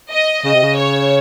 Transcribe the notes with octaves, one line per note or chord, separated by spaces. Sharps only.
D#5
C#3 D#5
C3
C#3
C#5